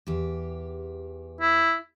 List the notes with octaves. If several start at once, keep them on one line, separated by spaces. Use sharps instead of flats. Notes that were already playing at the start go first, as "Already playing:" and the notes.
E2 G4
E4